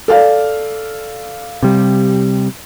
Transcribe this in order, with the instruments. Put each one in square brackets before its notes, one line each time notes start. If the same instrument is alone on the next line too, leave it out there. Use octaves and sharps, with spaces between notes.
[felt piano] A4 D5 F5
[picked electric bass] C3 G3